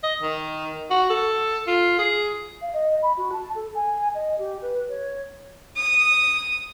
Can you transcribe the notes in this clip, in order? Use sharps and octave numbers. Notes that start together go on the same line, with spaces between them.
D#5
D#3
F#4
A4
F4
G#4
F5
D#5
B5
F#4
A5
A4
G#5
D#5
G4
B4
C#5
D#6